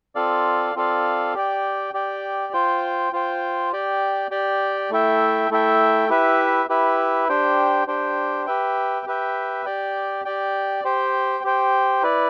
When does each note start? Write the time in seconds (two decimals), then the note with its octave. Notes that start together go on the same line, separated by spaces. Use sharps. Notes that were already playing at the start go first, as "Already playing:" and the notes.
0.15 C4 F4 A4 D5 F5
0.75 C4 F4 A4 D5 F5
1.34 G4 D5 G5
1.94 G4 D5 G5
2.53 F4 C5 G5
3.13 F4 C5 G5
3.73 G4 D5 G5
4.31 G4 D5 G5
4.90 A3 E4 A4 E5 G5
5.50 A3 E4 A4 E5 G5
6.09 E4 G4 B4 E5
6.69 E4 G4 B4 E5
7.29 D4 G4 C5 G5
7.87 D4 G4 C5 G5
8.46 G4 B4 E5 G5
9.06 G4 B4 E5 G5
9.66 G4 D5 G5
10.25 G4 D5 G5
10.84 G4 C5 G5
11.44 G4 C5 G5
12.02 E4 B4 D5